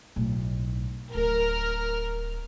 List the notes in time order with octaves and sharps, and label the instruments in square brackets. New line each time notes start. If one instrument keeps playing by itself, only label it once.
[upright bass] B1 A2
[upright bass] D1 [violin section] A#4 F6